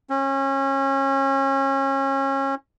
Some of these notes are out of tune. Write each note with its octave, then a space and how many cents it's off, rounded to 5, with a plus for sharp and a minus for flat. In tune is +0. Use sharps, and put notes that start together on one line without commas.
C#4 -30